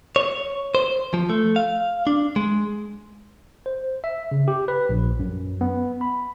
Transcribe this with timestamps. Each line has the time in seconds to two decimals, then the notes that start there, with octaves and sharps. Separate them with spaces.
0.16 C#5
0.75 C5
1.14 F3
1.30 A3
1.56 F5
2.07 D4
2.36 G#3
3.66 C5
4.04 E5
4.31 C#3
4.48 G4
4.68 B4
4.89 A#1
5.19 F#2
5.61 B3
6.01 B5